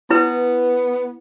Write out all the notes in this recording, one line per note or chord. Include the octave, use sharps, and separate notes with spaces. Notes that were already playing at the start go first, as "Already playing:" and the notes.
B3 E4 B4